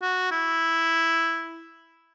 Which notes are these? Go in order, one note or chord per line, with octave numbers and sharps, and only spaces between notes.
F#4
E4